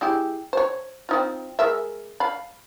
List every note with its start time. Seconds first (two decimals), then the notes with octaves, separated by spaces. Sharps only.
0.01 G#3 E4 G4
0.53 C5 C#5
1.09 C4 D#4 F4
1.59 G#3 A#4 E5
2.20 F5 B5